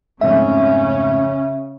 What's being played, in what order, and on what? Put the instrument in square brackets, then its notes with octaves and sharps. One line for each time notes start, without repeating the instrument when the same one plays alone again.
[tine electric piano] F2 G#2 A3 [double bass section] C#3 C#4 [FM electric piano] E5